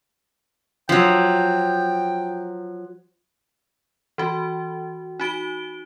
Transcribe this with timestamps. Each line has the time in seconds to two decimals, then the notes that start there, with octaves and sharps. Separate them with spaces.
0.89 F3 F#3 G5
4.18 E3 F#4
5.20 D#4 F#4 D7 G7